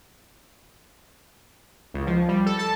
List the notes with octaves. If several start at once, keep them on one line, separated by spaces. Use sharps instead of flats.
C#2
F3
G3
A4
A5